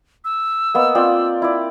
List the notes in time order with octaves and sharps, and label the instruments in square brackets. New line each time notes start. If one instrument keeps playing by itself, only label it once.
[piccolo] E6
[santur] A#3 B3 D#5
C4 F4 D5
E4 D5